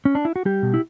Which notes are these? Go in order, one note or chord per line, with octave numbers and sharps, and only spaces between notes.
C#4
D4
E4
F#4
G3 G4
B2
E4